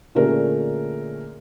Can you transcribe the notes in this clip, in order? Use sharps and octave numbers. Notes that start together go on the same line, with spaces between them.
A#2 D3 A3 C#4 G#4 A#4